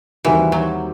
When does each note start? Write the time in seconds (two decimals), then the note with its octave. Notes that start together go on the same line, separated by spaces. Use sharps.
0.25 D#2 D#3 E3 G3 C4 F#4
0.52 F#3